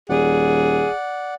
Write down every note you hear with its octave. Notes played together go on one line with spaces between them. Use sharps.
D#1 G#4 D5 F#5